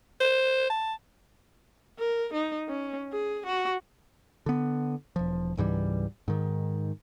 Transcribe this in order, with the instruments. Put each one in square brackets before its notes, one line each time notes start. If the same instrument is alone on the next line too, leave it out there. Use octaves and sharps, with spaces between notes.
[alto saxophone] C5
A5
[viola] A#4
D#4
C#4
G#4
F#4
[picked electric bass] D3 B3
E1 F3
C#2 G#2 E3 G3
G#2 D#3